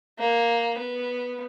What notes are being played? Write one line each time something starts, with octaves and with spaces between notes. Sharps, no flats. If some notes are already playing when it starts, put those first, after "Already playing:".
A#3
B3